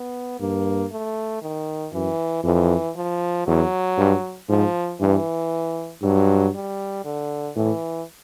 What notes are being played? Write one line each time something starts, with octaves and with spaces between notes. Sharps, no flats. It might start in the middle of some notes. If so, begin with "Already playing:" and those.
Already playing: B3
G2 A#3
A3
D#3
F#2 E3
F2 E3
F3
E2 F#3
G2
G#2 F3
G2 E3
G2 F#3
G3
D3
A2 E3